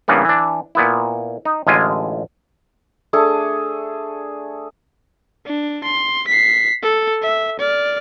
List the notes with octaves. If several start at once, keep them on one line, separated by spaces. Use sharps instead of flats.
G2 C#3 E3 A#3 B3
E3 D4
A#2 B3 E4
D#4
A1 D3 G#3 E4 F4 G#5
A3 D4 G#4 A4
D4
C6
B6 C7
A4
E5
D5 F6